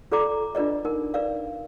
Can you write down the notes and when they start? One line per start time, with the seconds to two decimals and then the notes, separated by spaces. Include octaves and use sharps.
0.12 F4 A4 D5 A#5 D6
0.55 D4 F4 B4 D5 D#5
0.85 D#4 A#4
1.14 B4 D5 F5